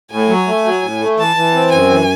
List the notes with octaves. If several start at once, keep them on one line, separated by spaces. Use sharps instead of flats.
A2 G#5
F#3
A3
F#3
A2
A3
E3 A5
E3
C4
F#2 G#5
E3